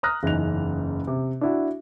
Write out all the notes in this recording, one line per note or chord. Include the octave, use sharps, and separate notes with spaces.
A#5 D#6 F6 F#6 A#6
F#1 E2 C#4 D#4 F7
C3
D4 E4 F#4